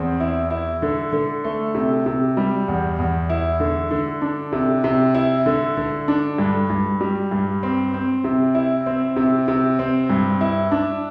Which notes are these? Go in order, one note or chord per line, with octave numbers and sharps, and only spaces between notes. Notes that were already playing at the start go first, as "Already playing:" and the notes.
Already playing: E2 C4
E4
E4
D3
D3
A3
C3
C3
G3
E2
E2
E4
D3
D3
D4
C3
C3
E4
D3
D3
D4
G2
G2
G3
G2
C4
C4
C3
E4
C4
C3
C3
C4
G2
E4
D4